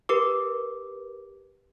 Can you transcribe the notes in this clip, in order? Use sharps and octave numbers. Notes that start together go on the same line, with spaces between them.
G4 A#4 B4 D6